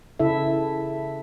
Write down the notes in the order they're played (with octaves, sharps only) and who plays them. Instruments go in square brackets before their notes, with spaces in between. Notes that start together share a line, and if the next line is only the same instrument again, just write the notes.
[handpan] C#3 E4 A4 E5